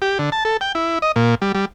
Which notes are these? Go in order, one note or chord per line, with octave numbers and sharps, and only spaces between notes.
G4
D3
A5
A4
G5
E4
D#5
A#2
G3
G3